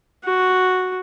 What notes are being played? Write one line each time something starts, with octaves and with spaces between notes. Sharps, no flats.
F#4